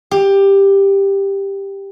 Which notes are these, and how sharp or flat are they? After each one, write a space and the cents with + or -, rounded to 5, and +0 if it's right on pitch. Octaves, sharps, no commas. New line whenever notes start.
G4 +10